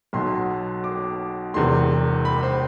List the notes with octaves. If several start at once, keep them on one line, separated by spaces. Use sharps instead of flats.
B1 B2 F#3 C6
D6
E1 E2 C3 C6
B5
C5